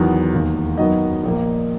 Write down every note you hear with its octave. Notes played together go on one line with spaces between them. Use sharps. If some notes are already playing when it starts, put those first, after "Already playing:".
Already playing: E2 D#3 F#3 B3
E1 D#2 D#3
F#2 D#3 F#3 B3 D#5
A#1 A#2 A#3